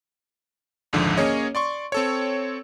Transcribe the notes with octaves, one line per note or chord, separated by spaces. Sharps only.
A#1 D#2 G#2 D3 F3
A#3 C#4 G#4 C#5 D#5
D5 C6 C#6
C4 A4 C#5